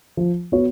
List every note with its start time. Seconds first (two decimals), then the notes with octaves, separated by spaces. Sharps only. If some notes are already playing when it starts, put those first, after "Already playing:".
0.17 F3
0.52 B3 F#4 C#5